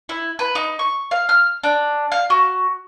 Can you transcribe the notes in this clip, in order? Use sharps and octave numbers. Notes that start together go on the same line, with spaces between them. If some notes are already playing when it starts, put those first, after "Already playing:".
E4
B4
D#4
C#6
F5
F6
D4
F5
F#4